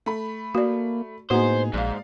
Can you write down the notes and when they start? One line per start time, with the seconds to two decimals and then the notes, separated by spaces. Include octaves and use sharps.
0.06 A3 B5
0.55 A#3 F#4 D5
1.31 A2 A#3 B3 D#4 F#4 G#4 C5
1.74 A#1 G#2 D5 F5